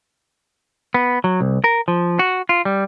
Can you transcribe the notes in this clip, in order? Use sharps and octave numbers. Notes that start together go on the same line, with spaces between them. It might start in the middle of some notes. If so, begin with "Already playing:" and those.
B3
F#3
C2
A#4
F3
F#4
F4
G3